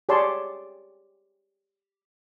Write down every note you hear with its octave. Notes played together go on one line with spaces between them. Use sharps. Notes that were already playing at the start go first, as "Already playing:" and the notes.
G4 G#4 C#5 D5 A5 C6